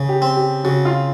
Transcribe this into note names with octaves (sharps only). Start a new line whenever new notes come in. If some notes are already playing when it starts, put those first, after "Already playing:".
Already playing: C#3
G4
C4
G4
C#3 F#4
F4